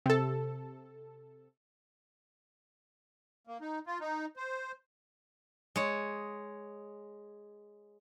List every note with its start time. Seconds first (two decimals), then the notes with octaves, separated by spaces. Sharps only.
0.06 C3 A4
3.47 A#3
3.61 D#4
3.87 F4
4.01 D#4
4.37 C5
5.76 G#3 C#5